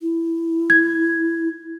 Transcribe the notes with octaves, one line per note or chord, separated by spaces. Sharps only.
E4
G#6